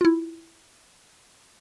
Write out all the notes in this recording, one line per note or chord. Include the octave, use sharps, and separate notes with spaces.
E4 F4